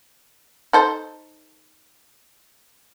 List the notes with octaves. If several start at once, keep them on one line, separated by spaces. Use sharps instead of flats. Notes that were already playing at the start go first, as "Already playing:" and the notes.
D#4 A4 C5